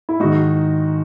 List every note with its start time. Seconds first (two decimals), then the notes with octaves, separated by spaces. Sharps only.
0.09 E4
0.20 G#2 D#3 D#4 F#4